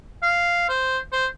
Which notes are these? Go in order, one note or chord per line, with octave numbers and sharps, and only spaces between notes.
F5
C5
C5